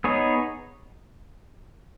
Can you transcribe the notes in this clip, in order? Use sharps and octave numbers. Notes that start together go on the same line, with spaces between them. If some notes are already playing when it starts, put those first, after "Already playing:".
B3 D#4 G#4 C#5